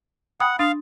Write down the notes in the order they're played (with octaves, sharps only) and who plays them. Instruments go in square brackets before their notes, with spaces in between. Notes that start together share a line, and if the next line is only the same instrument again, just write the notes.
[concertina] F#5 [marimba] G5 B5 D#6
[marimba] D4 D#6 A6 [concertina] F5